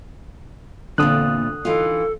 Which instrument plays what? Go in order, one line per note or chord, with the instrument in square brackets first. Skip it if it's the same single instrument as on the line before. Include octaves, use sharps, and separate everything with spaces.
[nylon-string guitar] E2 A#2 C4 [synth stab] D3 [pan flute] A#3 [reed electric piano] D#6 F#6
[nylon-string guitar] E3 D#4 F4 [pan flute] A4